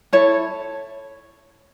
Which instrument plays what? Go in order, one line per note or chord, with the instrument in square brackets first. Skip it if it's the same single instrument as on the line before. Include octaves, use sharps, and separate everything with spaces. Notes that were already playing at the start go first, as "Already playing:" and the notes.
[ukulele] E4 A4 C#5